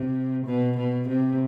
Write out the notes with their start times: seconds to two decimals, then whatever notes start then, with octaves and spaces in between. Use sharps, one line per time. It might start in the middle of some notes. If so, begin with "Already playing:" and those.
Already playing: C3
0.45 B2
0.77 B2
1.08 C3